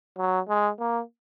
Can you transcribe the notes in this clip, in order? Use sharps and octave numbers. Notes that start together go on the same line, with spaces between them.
F#3
G#3
A#3